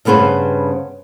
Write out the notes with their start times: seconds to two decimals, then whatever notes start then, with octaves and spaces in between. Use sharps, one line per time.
0.05 G2 C#3 B3 B4 C5